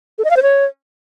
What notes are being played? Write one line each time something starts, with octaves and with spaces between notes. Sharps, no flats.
A4
D#5
F5
C5
C#5